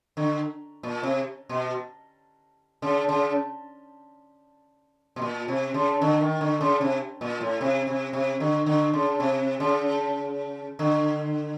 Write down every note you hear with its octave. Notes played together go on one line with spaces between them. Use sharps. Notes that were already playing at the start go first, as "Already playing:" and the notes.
D3
A#2
C3
B2
C#3
C#3
B2
A#2
C3
C#3
D3
D#3
D3
C#3
C3
A#2
A2
C3
C3
C3
D3
D3
C#3
C3
C#3
D3